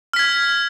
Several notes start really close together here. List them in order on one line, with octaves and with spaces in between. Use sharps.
F6 B6 G#6